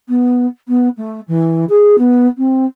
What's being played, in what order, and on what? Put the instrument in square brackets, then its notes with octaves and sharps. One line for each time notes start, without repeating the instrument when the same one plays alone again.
[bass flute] B3
B3
A3
E3
G#4
B3
C4